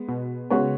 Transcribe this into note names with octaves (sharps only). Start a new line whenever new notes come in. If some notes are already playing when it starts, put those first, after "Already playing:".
Already playing: G#3 B3
B2
C#3 G#3 B3 F#4 C#5